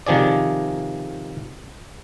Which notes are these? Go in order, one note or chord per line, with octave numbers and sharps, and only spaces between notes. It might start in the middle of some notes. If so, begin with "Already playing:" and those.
C3 D#3 F3 G#4 D5